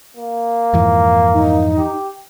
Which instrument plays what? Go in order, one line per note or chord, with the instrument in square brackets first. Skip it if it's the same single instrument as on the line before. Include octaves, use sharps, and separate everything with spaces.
[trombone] A#3
[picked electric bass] F2 G#2 E3
[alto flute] D#4
[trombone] G4